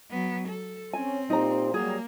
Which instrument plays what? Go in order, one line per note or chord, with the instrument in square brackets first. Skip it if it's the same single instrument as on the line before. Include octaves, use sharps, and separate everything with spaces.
[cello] F#3 B3
A4
[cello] C4 [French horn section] C#4 [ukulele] G#5
[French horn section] A#2 G4 C5 [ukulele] D#4 A#5
[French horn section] F#3 G3 [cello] A#3 [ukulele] G#4